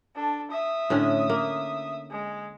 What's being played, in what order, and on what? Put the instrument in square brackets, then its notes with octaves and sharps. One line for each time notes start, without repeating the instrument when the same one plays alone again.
[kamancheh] D4 A4
E5 D#6
[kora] A2 D3 C#4
A#3
[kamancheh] G#3